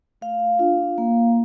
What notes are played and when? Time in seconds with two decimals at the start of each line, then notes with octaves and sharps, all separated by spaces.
0.21 A3 F5
0.59 D4 F4
0.98 A#3